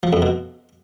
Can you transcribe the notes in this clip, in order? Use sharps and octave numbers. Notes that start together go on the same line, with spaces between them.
F3
F2
B2